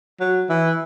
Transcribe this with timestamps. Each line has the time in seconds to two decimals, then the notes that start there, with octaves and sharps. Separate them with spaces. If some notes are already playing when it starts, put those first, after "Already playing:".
0.20 F#3
0.50 E3